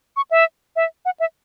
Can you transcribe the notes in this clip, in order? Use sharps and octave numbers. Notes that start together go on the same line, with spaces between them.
C#6
E5
E5
F#5
E5